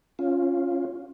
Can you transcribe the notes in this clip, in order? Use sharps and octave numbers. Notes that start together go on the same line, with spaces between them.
C#4 F4